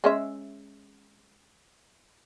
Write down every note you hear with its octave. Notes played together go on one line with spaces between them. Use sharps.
G#3 C#4 E5